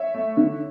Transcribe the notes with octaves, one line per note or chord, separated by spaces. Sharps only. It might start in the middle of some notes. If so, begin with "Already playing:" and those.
Already playing: C#5 E5
A3
D3